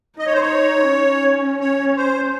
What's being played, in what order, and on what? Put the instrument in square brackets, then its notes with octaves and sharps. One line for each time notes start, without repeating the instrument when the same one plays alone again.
[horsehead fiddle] D#4 [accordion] D#5
[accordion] C#5
C5
C#5
[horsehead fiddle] C#4
[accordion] C#5
C5